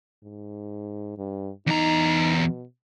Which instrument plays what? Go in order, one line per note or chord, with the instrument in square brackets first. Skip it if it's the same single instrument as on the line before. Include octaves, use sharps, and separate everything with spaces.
[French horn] G#2
G2
[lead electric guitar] E2 A#5 [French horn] D#4
[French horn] B2